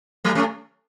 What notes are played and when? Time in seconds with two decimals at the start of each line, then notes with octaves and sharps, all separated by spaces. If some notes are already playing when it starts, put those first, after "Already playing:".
0.24 F#3 A3
0.35 A3 C#4